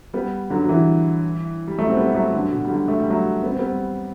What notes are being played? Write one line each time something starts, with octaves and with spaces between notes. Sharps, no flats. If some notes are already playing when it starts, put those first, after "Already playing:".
G3 B3
D3 F#3
F#3
E3 G3
G3
F#3 A3
C4
G3 B3
F#3 A3
D3 F#3
B2
G3
D3 F#3
A3
G3
F#3 A3
B3
C4
G3 B3